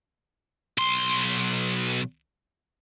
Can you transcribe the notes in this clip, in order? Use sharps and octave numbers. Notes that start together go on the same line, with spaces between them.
B1 C6